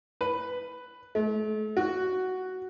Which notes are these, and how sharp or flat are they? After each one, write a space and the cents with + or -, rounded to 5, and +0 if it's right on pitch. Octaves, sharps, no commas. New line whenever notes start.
B4 +10
A3 -40
F#4 +5